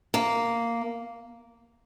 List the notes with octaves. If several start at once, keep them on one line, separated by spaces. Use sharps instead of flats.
A#3